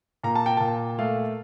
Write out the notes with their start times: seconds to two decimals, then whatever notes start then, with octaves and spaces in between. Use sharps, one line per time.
0.23 A#2 A#5
0.35 A5
0.46 G5
0.57 A#2 A5
0.99 A3 F5